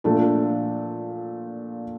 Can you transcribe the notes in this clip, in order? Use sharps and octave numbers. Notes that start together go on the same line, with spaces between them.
A#2 F3 A3 D4 A4